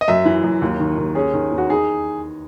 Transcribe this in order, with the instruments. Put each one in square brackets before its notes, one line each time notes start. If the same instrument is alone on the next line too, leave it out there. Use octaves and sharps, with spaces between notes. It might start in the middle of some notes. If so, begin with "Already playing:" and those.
[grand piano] D#5
[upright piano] F#2 [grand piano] E5
[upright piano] E3
F#2
D#2
D#3
D#2
[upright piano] C#4 [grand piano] G#4
[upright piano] D#3
E2
[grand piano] F#4
[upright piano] D#4 [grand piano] G#4